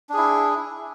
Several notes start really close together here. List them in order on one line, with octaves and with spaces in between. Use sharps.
D4 G#4 E4